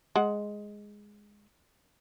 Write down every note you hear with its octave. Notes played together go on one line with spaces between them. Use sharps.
G#3 F#5